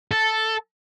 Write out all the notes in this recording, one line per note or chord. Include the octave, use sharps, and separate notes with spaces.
A4